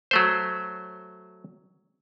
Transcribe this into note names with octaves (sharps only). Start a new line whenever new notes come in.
F#3 A3 C5